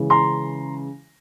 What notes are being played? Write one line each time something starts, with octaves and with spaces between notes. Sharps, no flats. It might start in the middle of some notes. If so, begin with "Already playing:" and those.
Already playing: C#3 E3 G#3
A#5 C6